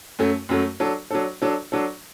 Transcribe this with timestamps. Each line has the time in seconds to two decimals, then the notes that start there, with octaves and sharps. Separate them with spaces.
0.19 F#2 F#3 A3
0.49 F#2 F#3 A3
0.80 F#3 D4 A4
1.11 F#3 D4 A4
1.42 F#3 D4 A4
1.72 F#3 D4 A4